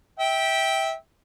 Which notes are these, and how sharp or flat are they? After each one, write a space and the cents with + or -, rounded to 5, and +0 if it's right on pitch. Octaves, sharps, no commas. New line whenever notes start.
E5 -20 G5 +0